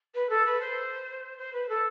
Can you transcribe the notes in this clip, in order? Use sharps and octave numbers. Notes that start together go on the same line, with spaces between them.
B4
A4
B4
C5
C5
B4
A4